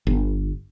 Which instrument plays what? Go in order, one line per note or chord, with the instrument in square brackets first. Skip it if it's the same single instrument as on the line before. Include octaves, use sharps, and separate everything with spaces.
[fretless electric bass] G1